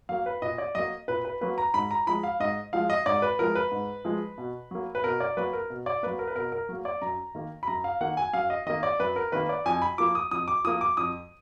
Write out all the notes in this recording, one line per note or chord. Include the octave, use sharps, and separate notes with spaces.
F#3 A#3 F5
B4
A#2 D#5
D5
F#3 A#3 D#5
A#2 B4
B4
F#3 A#3 B4
A#5
G#2 B5
A#5
F3 G#3 B5
F5
G#2 D#5
F3 G#3 F5
D#5
G#2 D5
B4
F3 G#3 A#4
B4
G#2
F3 G#3
B2
F#3 A#3
B4
B2 A#4
D5
F#3 A#3 B4
A#4
B2
D5
F#3 A#3 B4
A#4
B4
B2 A#4
A#4
F#3 A#3
D5
F#2 A#5
D#3 A#3
B5
F#2 A#5
F5
D#3 A#3 F#5
G#5
F#2 F5
D#5
D#3 A#3 D#5
D5
F#2 B4
A#4
D#3 A#3 B4
D5
F2 G#5
B5
F3 A#3 D6
D#6
F2 D#6
D6
F3 A#3 D#6
D6
F2 D#6